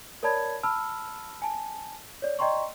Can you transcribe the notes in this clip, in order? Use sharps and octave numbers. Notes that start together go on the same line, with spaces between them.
A#4 C#5 D5 A5 B5 G#6
A5 B5 E6 F6
G#5 A5
C#5 D5
D5 D#5 G5 A#5 C6 C#6